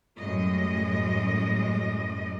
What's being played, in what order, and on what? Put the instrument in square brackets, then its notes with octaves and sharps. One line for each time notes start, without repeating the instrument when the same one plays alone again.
[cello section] F#2 A2 G3 G#3 D#5